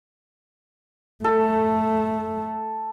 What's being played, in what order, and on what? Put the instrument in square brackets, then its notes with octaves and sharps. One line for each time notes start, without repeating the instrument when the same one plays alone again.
[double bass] A3 [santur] A4